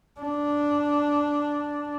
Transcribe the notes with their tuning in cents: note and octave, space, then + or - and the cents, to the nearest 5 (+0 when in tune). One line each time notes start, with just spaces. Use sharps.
D4 -5